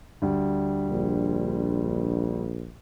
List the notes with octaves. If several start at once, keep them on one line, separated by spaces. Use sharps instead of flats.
D2 G3
A#1